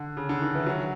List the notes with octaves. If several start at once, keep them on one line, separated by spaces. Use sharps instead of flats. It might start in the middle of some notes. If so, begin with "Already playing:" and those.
Already playing: D3
C#3
D3
D#3
E3
F#3